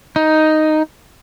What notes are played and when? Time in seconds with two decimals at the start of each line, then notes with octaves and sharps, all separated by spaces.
0.16 D#4